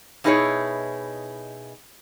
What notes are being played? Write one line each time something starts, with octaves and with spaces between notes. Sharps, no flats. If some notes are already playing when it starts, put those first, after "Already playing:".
B2 D#4 E4 G4 G#4 C#5